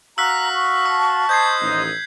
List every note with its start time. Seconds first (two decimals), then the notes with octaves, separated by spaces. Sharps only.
0.18 F#4 F5 A#5 E6 F#6 B6
0.55 C#6
0.86 A5 E6
1.29 C5 D#5 G6 G#6 C7
1.61 A1 D#2 D#4